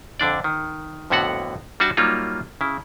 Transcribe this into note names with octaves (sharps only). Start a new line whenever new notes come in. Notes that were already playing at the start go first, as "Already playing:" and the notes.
F2 D3 D4 D5
D#3
F2 A2 D3 B3 F#4 F#5
G3 D4 F#4 E5 A5
F#3 G3 A#3 D#4 F4
C#3 E4